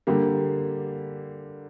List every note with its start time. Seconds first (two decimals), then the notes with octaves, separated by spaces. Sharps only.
0.07 D3 G3 A#3